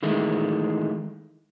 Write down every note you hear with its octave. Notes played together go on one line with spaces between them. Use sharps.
D#3 E3 G#3 A3